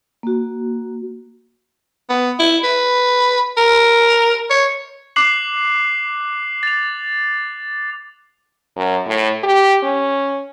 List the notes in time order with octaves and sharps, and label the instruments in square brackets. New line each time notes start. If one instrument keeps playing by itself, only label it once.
[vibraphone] A#3 F#4
[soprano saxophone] B3
E4
B4
A#4
C#5
[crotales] D6 F#6 C7 F#7
A6 F7
[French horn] F#2
A2
G4
C#4